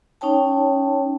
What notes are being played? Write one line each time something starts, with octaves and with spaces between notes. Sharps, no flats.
C#4 D#4 C#5 G5 A5